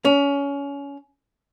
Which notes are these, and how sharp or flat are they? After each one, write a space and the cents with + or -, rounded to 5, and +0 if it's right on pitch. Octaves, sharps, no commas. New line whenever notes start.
C#4 +25